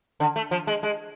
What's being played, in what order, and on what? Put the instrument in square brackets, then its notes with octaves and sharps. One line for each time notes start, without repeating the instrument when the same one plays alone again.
[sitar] D3
A3
F3
G#3
G#3